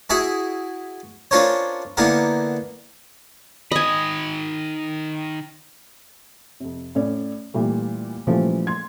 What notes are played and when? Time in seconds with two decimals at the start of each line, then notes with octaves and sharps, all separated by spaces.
0.10 E4 F#4 G#4 E5
1.31 C#4 D4 F4 A#4 C5 C#5
1.97 D3 E3 A#3 B3 A#4
3.72 D#3 D#5 G#5 B5
6.60 F2 C3
6.95 A2 C#4 D5
7.54 A#2 E3 G3 A3
8.27 A#2 C#3 E3 F3 G3 A3
8.67 C6 G#6